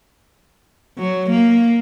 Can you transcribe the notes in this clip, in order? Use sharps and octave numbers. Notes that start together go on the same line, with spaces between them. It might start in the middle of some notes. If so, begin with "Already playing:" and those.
F#3
A#3